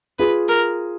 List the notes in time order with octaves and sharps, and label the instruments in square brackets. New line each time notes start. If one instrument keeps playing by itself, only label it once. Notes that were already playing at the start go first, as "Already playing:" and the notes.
[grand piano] F4 G#4 [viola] B4
[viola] A#4